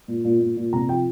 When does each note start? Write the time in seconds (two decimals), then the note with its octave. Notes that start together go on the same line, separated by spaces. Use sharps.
0.08 A#2
0.25 A#2
0.40 A#2
0.56 A#2
0.73 C3 A#5
0.89 F3 G5